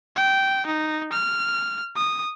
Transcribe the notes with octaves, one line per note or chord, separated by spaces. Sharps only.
G5
D#4
F6
D#6